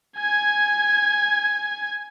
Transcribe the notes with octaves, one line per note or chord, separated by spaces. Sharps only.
G#5 G#6